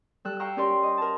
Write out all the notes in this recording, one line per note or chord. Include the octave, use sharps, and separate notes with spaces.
G3 A4 E6 F#6
F5 G5 A#5 C#6 E6
C#4 G4 A#4 D5 C6
D#5
A#4 A5